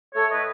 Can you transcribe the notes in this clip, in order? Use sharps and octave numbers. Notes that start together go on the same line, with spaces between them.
A3 A4 C#5
A2 B4 D#5